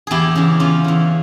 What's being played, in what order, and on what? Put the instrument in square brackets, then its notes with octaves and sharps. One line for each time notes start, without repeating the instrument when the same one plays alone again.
[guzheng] E2 E4 G4 G#4
C#3 E3
E2 C#4 F4
C#3 E3